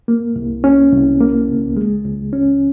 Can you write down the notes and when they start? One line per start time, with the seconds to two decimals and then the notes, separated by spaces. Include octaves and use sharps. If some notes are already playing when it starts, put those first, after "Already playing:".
0.08 A#3
0.36 C2
0.64 C#4
0.92 C2
1.20 A#3
1.49 C#2
1.76 G#3
2.04 C#2
2.33 C#4